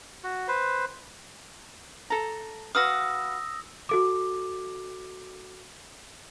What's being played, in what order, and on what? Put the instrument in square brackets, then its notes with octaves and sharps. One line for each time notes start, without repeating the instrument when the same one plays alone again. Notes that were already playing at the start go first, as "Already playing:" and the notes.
[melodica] F#4
B4 C5
[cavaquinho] A4 A#5
[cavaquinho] F#4 B4 F5 [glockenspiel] D#6 E6 A#6
[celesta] F#4 A4 D6